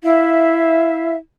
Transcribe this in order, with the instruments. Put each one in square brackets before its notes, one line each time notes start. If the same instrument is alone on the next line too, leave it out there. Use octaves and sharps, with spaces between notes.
[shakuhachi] E4 [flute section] E5 F5